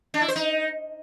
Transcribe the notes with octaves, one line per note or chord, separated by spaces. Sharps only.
D4
E4
C5
D#4